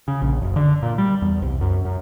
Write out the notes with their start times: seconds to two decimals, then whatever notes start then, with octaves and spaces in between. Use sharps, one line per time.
0.08 C#3
0.22 A#1
0.42 F#1
0.56 D3
0.83 A#2
0.98 G3
1.22 E2
1.42 C2
1.61 F#2
1.85 F#2